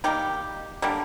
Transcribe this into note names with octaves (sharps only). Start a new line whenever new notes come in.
D#3 G3 A#3 G4
D3 G3 A#3